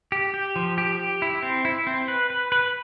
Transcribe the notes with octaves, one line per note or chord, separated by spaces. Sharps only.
G4
G4
F3
G4
G4
E4
C4
E4
C4
B4
B4
B4